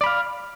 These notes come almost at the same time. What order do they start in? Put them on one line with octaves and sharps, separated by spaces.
D5 B5 F5